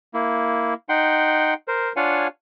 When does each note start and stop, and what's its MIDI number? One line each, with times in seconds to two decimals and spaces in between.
0.14 0.74 58
0.14 0.74 64
0.89 1.54 63
0.89 1.54 78
0.89 1.54 79
0.89 1.54 84
1.68 1.92 70
1.68 1.92 72
1.96 2.27 62
1.96 2.27 65
1.96 2.27 73
1.96 2.27 77
1.96 2.27 78
1.96 2.27 80